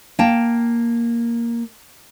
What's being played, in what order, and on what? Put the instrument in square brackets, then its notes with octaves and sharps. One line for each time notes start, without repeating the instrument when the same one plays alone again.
[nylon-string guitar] A#3 G5 A5